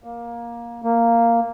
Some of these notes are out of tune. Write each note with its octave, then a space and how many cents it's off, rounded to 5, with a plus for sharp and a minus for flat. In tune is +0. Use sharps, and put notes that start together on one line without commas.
A#3 +15
A#3 -5